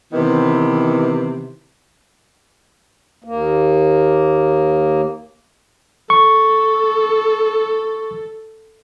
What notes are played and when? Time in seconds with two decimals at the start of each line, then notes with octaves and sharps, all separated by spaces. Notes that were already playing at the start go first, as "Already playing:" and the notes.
0.13 C3 D#3 E3 B3
3.24 D#2 A#3
6.10 A4 C#6